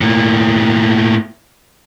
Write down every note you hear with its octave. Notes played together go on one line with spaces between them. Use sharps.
A2 A#3